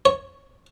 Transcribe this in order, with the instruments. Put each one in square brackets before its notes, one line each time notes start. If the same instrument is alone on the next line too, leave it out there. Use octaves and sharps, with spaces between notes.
[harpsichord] C#5